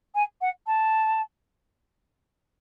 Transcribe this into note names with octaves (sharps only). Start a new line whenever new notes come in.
G#5
F#5
A5